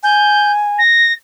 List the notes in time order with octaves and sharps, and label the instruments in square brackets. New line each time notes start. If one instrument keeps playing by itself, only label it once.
[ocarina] G#5 [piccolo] G6
[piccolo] A#6